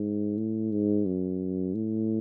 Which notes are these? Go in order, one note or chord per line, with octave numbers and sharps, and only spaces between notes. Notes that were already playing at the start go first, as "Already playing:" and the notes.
Already playing: G#2
A2
G#2
F#2
A2